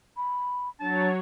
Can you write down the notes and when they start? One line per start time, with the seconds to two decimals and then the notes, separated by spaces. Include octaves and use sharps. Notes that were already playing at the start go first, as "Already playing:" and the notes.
0.17 B5
0.80 F#3 D4 C#5 A5